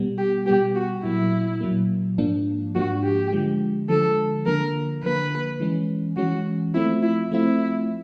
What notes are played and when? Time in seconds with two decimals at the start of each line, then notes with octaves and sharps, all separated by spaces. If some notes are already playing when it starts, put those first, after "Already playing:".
Already playing: B2 G3 B3
0.18 G4
0.46 B2 G3 B3 G4
0.76 F#4
1.03 A#2 F#3 A#3 E4
1.61 A#2 F#3 A#3
2.18 G#2 F3 A#3 D4
2.75 G#2 F3 A#3 D4 F#4
3.03 G4
3.32 D3 F3 G#3
3.89 D3 F3 G#3 A4
4.46 D3 F3 A#3 A#4
5.03 D3 F3 A#3 B4
5.60 E3 G#3 C#4
6.17 E3 G#3 C#4 F#4
6.74 F3 A3 C4 E4 F4
7.03 E4
7.32 F3 A3 C4 E4 F4